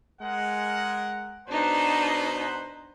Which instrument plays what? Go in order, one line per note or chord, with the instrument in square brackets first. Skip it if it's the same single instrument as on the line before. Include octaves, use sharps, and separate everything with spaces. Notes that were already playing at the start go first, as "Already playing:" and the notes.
[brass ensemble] G#3 A#4 F#5
[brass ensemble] B2 B4 C5 [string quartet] D4 D#4